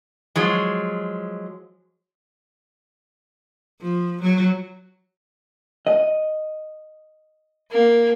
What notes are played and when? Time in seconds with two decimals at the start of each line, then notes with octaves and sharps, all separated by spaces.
0.36 F3 F#3 G#3
3.81 F3
4.22 F#3
5.87 D#5
7.71 A#3